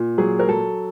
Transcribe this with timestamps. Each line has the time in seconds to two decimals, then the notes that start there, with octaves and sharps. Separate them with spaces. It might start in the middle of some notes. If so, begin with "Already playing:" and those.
Already playing: A#2
0.18 F#3 G#4
0.39 A#4
0.48 F#3 A4